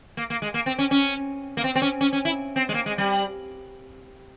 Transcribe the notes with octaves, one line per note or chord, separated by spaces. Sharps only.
A#3
A#3
G#3
A#3
C4
C#4
C#4
A#3
C4
C4
C#4
C#4
C#4
E4
C4
G#3
A#3
G#3
G3